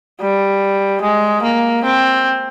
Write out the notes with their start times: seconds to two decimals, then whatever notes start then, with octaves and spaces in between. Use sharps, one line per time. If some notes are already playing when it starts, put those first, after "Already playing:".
0.21 G3
1.02 G#3
1.42 A#3
1.85 C4